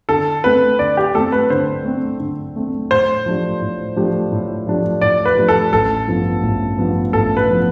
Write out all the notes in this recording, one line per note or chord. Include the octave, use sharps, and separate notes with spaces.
D3 A4
A3 C4 B4
D3 D5
G4
A3 C4 A4
B4
D3 C5
A3 C4
D3
A3 C4
A2 C5
F3 A3 D4 G4
A2
F3 A3 D4 G4
A2
F3 A3 D4 G4
A2 D5
B4
F3 A3 D4 G4
A4
A1 A4
G2 F3 B3
A1
G2 F3 B3
A1 A4
B4
F3 B3